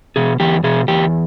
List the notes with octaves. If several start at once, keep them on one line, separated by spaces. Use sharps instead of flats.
B2 G#4
E2 G4
B2 G#4
E2 G4